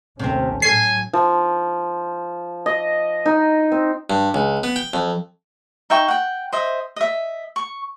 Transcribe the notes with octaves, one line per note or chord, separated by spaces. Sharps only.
D#2 C3 A3 C4 C#4
A2 F#3 C#4 A4 G#5 C7
F3
D#5
D#4
C4
G2
C#2
B3
G5
F2
D#4 E5 G5 C#6
F#5 G5
C5 D#5 E5
D#5 E5
C#6